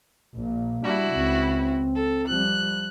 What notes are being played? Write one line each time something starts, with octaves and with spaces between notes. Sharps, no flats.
A#1 A#2 A#3
G3 D4 E4 F#4
C#2 C4
A4
F3 G3 F#6